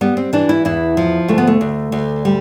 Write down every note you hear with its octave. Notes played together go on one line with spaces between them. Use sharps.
G3 B3
C4
E3 D4
E4
E2 E4
F3
D2 A3
B3
A3
D2
D2
G3